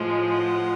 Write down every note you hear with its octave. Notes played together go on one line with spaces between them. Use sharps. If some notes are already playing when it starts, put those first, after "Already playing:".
Already playing: A2 F3 G#3
F#5